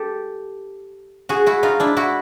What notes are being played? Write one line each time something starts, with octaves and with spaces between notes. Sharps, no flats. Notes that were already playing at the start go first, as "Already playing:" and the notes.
Already playing: G4 A4
F#4 G#4
E4 F#4
D#4 F4
D4 E4
E4 F#4